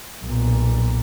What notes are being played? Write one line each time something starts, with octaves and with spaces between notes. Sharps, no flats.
B1 A#2